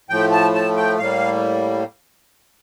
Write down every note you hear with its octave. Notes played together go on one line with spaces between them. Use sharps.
A2 F3 A3 G5
A5
A5
G5
A2 G3 A#3 F5